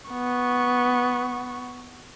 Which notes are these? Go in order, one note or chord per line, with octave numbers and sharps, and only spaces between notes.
B3 C#6